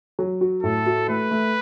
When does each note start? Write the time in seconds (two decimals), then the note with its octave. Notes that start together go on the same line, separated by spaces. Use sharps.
0.19 F#3
0.41 F#4
0.63 A2 A4
0.86 F#4
1.08 A3 B4
1.31 A3